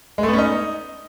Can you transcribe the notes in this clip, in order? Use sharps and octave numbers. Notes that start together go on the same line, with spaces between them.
G#3
A3
B3
C#4
D#4